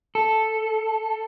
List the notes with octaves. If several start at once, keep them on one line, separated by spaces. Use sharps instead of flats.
A4